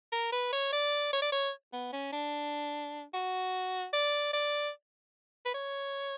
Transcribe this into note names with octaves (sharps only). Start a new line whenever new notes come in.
A#4
B4
C#5
D5
C#5
D5
C#5
B3
C#4
D4
F#4
D5
D5
B4
C#5